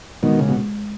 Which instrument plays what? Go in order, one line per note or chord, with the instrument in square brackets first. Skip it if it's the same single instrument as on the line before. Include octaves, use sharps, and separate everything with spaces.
[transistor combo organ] B2 D#3 [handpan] G#3
[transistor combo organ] C#3
[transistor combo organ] B2 [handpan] G#3